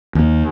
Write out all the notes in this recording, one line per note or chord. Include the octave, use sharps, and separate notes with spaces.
D#2